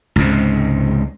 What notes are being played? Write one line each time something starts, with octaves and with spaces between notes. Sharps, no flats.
C#2 G#2 C3